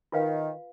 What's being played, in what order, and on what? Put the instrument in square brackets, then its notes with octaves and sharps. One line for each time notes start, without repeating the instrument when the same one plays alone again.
[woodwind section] D#3 [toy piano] F4 B4 F5